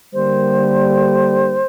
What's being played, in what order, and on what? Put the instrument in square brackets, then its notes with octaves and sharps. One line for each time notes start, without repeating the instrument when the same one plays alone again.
[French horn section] D3 G3 A#3 [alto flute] C5